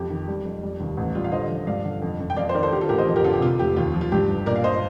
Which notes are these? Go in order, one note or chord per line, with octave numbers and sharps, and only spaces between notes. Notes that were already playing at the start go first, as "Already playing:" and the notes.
Already playing: F2 G4
D#3
G3
F2
G3
D#2
A1
G3 F4
F5
D3 C5 D#5
F3
G2 D5 F5
D3
F2
F2
G5
F2 D5 F5
C5
D#3 A#4 D5
A4 C5
D3 G4 A#4
F4 A4
A1 G4 A#4
C5 D#5
F2
G4 A#4
D3 F4 A4
G4
C3 F4
F1 G4
D#2 F4
F3
F4
G2 G4
G1
A#2 A#4 D5
F5
C5 D#5